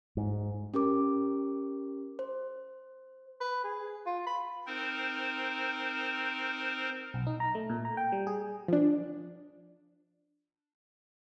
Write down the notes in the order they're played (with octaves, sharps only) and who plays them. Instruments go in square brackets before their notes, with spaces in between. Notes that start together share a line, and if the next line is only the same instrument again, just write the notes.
[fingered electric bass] G#2
[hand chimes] C#4 G4 A#4 D6
C5
[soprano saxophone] B4
G#4
F4
B5
[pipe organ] C4 D#4 A#4 C5
[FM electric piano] B1
D#4
A#5
A3
A#2
A#5
G5
G3
G#4
[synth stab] F3 D4